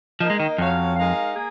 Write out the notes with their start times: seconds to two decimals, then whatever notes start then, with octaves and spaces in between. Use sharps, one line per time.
0.20 F3 A#3 D#4 A#4 D#5
0.30 G#3
0.40 D#3
0.58 F2 F#3 C#4 F#4 C#5 F5
0.96 G#3 D#4 A#4 F5
1.35 A#3 G#4